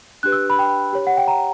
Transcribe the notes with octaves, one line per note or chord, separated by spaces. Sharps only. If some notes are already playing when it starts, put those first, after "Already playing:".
D4 G4 B4 F#6
E6
B5
G5
G4 C#5
F#5
G5
A#5